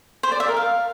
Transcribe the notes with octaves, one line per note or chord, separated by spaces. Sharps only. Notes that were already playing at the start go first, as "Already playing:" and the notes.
C5
D5
E5
A#4
F5